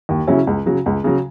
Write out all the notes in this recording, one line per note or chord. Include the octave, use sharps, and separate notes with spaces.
D#2
C#3 F#3 C#4 E4
C#2
C#3 F#3
C#2
C#3 F#3